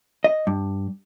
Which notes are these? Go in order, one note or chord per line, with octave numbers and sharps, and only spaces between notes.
D#5
G2